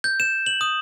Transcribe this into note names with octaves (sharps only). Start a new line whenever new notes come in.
G6
E7
F#7
D#6